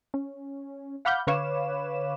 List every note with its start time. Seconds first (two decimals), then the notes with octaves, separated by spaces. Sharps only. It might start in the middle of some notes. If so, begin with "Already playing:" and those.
0.14 C#4
1.05 F5 F#5 B5 D6 F6 G6
1.27 D3 B4 C#5 F5 D6 E7